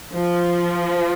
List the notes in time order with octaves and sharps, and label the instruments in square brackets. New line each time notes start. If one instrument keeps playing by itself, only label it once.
[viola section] F3